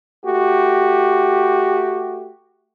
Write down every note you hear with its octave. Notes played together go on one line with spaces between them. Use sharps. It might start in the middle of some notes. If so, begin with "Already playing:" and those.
A3 F#4 G4